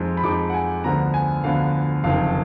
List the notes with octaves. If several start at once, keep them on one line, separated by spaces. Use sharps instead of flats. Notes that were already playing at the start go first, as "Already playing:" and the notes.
Already playing: F2 F3 G#3 D#4
B5
F2 F3 G#3 D#4 D6
F#5
G#5
D2 D3 F3 B3 A#5
G#5
D2 D3 F3 B3 F5
F#1 F2 D#3 F5